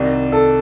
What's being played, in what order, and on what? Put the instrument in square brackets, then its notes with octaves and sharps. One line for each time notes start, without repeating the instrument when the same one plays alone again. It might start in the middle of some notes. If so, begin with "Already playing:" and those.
Already playing: [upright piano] C2 C3 D#3 [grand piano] D5
[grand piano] A4